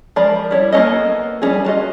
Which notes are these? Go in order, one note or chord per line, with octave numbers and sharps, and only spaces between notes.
F3 G#3 A#4 D5 B5
G3 E4 C#5
A#3 B3 C#4 A4 D#5
G3 C#4 D#4 G#4
D4 F4 F#4 D#5